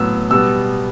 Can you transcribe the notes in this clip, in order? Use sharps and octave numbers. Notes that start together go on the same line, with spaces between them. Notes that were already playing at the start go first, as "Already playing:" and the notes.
Already playing: A2 F#3 B3 E6
B2 G3 B3 E6